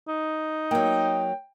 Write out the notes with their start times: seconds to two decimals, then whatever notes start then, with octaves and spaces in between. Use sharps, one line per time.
0.08 D#4
0.71 F#3 A#3 G5